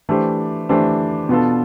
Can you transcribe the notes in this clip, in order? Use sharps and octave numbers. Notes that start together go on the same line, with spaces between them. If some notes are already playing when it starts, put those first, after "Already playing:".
E3 A3 D4 G4 C5
E3 A3 D4 G4 C5
B2 B3 D4 F4 A4